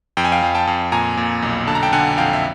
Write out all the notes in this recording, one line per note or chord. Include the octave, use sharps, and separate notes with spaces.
F2 G5
G#5
F5 G5
F2
G5 A5
F2
A#2 G#5 A#5
A#2
B1
D3 A5
A#5
G5 A5
D3 F#5 G#5
F2 F5 G5
E5